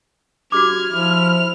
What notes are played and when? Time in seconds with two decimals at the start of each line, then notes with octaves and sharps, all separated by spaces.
0.52 F#4 G4 D6 F6 G#6
0.92 F3 E4 F7